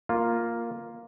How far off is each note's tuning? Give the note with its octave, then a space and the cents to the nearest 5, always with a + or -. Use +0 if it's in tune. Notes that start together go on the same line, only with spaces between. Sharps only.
A#3 +0 F4 +0